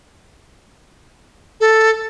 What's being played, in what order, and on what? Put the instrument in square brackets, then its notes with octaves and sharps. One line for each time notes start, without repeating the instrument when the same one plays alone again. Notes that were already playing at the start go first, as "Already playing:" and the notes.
[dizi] A4